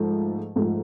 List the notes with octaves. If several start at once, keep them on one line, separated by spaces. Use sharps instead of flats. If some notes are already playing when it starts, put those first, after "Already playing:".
Already playing: G#2 F3 A3
G#2 F3 A3